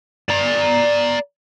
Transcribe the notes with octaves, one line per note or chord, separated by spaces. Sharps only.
D5 A#5